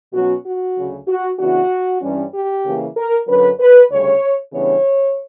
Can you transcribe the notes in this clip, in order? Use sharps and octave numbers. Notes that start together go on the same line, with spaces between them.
B2 F#3 C#4 F#4
F#4
D2 C#3 F#3
F#4
C#3 E3 B3 D4 F#4
G2 E3 G3 C#4
G4
C#3 E3 A#3 C#4
A#4
F#2 D3 F#3 C#4 B4
B4
D2 C#3 G3 C#4 C#5
C#3 E3 G3 B3 D4 C#5